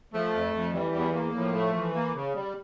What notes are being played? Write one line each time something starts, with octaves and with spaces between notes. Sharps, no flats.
F3 A3
F2
F2
E3 G3
E2
A#3
A2 F3
A3
E3
A#3
C#3
G3